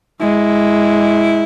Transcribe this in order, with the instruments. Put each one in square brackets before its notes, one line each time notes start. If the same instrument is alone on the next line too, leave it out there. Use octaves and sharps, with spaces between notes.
[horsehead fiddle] G#3 [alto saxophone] E4